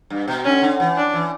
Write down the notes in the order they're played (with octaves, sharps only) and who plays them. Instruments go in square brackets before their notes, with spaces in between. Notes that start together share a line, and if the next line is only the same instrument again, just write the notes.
[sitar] G2
B2
[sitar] D3 [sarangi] C#4
[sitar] D3
E3
[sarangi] D4
[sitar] E3